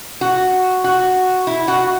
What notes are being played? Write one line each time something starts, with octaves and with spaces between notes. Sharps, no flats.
F#4
F#4
E4
F#4